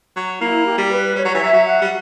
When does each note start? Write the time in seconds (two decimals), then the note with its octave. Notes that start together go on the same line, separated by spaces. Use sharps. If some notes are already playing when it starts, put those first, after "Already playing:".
0.16 F#3
0.41 A#3 E4
0.66 G4
0.78 G3
0.91 B4
1.15 G3 C#5
1.25 F#3
1.34 E3
1.40 F#3 E5
1.53 F#3
1.66 F#5
1.81 G3